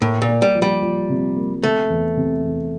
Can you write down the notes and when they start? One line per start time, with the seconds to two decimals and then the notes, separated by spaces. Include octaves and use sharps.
0.01 A2 A#3
0.22 A#2
0.29 A#3
0.42 G3
0.55 F3
0.62 G3
0.82 F3
1.10 C3
1.36 A#3
1.63 C3 A3
1.90 E2
2.17 C3
2.44 E2